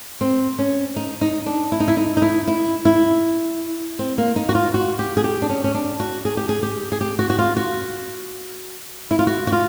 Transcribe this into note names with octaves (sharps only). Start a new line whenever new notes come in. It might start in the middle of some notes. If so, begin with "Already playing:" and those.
C4
C#4
D#4
D#4
D4
E4
D#4
E4
D#4
D#4
E4
E4
E4
C4
A#3
D#4
F#4
F4
F#4
G4
G#4
G4
D4
C#4
C#4
D4
F#4
G#4
G4
G#4
G4
G#4
G4
F#4
F#4
F4
F#4
E4
F4
F#4
F#4
F4